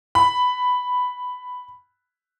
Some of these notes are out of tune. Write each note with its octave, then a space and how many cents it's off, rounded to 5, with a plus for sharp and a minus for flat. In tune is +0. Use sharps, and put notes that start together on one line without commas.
B5 +5